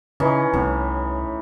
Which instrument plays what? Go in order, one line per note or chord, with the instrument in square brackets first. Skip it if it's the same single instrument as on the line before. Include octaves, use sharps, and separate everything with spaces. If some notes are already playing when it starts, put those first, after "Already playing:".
[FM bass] C#3 [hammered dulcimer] E3 C#4 D#4
[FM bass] C2 [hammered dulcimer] A2